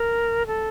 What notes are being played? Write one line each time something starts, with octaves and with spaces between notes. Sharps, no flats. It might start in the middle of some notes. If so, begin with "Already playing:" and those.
Already playing: A#4
A4